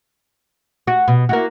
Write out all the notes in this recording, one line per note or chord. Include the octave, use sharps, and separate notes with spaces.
F#4
B2
A#3 E4 F#4